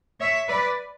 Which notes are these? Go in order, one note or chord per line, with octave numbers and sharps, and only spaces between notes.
C#5 E5
B4 D5